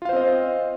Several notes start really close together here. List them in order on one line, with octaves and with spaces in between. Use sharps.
F4 F5 C5 C4 D#5